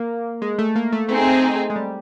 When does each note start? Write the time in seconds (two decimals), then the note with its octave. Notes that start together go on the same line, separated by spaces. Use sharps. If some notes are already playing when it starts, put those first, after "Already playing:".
Already playing: A#3
0.42 G#3
0.59 A3
0.76 A#3
0.93 A3
1.09 A3 C4 D#4 G#4
1.70 G#3
1.76 G3